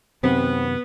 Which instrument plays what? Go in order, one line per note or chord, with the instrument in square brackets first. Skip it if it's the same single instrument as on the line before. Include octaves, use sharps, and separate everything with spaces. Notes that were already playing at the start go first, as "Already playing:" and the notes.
[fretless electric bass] F#2 C3 D#3 [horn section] B3 [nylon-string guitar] C4